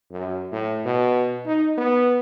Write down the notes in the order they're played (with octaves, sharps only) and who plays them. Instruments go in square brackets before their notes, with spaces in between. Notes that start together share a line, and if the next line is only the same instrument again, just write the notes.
[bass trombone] F#2
A2
B2
D#4
B3